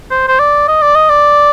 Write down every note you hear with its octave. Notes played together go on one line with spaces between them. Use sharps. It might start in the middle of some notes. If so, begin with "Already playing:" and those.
C5
C5
D5
D#5
D5
D#5
D5